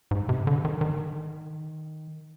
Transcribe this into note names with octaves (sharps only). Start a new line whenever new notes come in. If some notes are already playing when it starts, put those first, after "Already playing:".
G#2
C3
D3
D#3
D#3